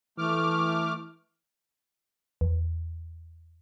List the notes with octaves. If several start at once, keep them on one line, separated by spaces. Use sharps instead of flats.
E3 A3 D6 F6
E2